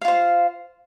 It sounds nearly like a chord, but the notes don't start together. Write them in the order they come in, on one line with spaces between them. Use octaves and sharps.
F5 F4 C5